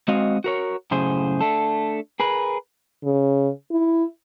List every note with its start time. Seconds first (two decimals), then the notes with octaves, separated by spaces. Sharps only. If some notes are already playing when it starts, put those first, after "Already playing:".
0.08 G#3 C4 F#4 D#5 F5
0.44 F#4 A#4 C#5
0.91 F#2 A2 C#3 G#4 C5
1.41 A3 D4 A4
2.20 G#4 A#4 B4
3.04 C#3
3.71 E4